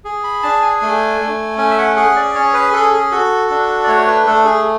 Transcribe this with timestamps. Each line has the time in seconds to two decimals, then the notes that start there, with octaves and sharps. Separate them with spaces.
0.05 G#4
0.24 B5
0.43 D4 A5
0.62 G#5
0.82 A3
1.20 A3
1.58 C#4 G#5
1.71 E5
1.78 F#5
1.96 G#4 F#5
2.16 D5
2.35 C#4 C#5
2.53 B4
2.73 G#4 A4
2.93 G#4
3.11 F#4 A4
3.50 D4
3.84 D5
3.88 A3 C#5
4.07 B4
4.27 A3 A4
4.45 G#4